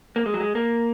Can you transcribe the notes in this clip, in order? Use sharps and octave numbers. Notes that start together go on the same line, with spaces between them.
A#3
G#3
F#3
G#3
A#3